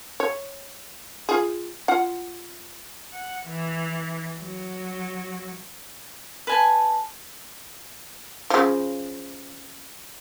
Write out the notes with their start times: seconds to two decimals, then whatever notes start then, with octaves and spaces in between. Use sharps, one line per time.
0.20 C#5
1.29 F4 G#4
1.88 F4 F#5
3.13 F#5
3.46 E3
4.39 F#3
6.47 B4 G#5 A5
8.50 C#3 F3